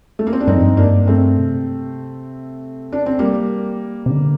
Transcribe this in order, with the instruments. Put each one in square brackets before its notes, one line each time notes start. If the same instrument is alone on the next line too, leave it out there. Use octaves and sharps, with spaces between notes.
[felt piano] A3
A#3
C4
D4
[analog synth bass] G2 [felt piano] C4 D#4
[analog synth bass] F2
G2
[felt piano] A#3 D4
A3 C4
[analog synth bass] C3
[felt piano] D4
C4
G3 A#3
[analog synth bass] C3
D3